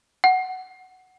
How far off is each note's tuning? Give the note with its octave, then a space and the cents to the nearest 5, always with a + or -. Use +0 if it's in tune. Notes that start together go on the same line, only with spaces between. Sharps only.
F#5 +5